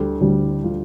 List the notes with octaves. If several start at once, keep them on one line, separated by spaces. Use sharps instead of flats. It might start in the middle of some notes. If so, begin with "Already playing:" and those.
Already playing: D2 D3 G3 G4
D2 D3 G3
D3 G3 F4